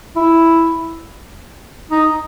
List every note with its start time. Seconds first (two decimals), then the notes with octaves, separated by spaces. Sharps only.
0.16 E4
1.91 D#4